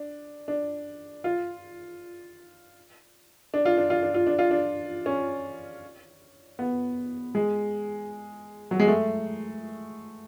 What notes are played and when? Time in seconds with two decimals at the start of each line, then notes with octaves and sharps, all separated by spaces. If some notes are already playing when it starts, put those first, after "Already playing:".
Already playing: D4
0.48 D4
1.24 F4
3.54 D4
3.65 F4
3.78 D4
3.90 F4
4.03 D4
4.14 F4
4.27 D4
4.39 F4
4.51 D4
5.06 C#4
6.59 B3
7.35 G#3
8.71 F#3
8.80 G#3
8.88 A3